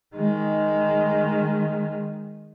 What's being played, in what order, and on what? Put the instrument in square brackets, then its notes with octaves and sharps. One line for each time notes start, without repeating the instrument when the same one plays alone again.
[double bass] D#3 G#3